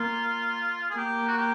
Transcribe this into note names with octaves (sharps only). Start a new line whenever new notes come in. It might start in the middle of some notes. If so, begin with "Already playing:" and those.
Already playing: A#3 F4
G#4
A#3 G4
F#4
G4